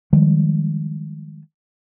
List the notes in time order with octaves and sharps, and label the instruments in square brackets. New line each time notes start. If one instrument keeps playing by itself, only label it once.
[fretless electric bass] D#3 F3 G3 G#3